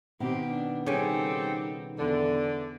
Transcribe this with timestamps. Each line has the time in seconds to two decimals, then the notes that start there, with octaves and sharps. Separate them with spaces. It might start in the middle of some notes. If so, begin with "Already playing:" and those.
0.20 B2 D#3 C4 G4
0.50 D4
0.86 C#3 G3 C4 D#4 G4 A4 G#5
1.98 E2 D3